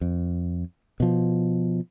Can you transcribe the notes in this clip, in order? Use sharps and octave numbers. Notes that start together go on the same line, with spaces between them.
F2
B2 F3